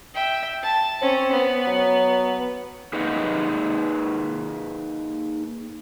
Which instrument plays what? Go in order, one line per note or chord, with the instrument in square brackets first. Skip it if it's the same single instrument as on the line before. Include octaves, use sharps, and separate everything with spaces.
[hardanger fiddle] E5 G5
A5
[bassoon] C4 [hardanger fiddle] C#4
[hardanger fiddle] B3
[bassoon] F#3
[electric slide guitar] A#3 D#4 G#4 B4 D#5 F#5